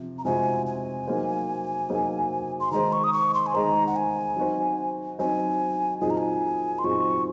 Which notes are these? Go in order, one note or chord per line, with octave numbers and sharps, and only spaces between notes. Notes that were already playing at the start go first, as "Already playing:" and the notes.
Already playing: C3 F3
A#5
C3 F3 G#3 C4 F#4 G#5
G#5
F#3 A#3 D#4 G#4 C5
F#3 A#3 D#4 G#4 C5
C6
D#3 G#3 D#4 G#4 C5 A#5
C#6
D#6
C#6
C6
G#5
D#3 G#3 D#4 G#4 C5 A#5
F#5
G#5
F#3 C4 D#4 F#4 C5
F#3 C4 D#4 F#4 C5 G#5
A#2 F#3 C4 D#4 G#4 G#5
A#5
G#5
C6
A#2 F#3 C4 D#4 G#4 C#6